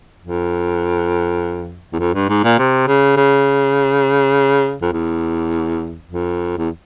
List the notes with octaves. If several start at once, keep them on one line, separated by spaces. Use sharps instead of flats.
F2
E2
F2
G2
G#2
A#2
C3
C#3
C#3
F2
E2
F2
E2